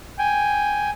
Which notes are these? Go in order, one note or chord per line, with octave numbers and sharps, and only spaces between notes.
G5 G#5